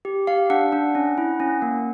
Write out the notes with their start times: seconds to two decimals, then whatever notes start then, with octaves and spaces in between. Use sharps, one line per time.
0.05 G4
0.27 G4 F5
0.50 D4 F#5
0.72 D4
0.95 C#4
1.18 E4
1.40 C#4
1.62 A#3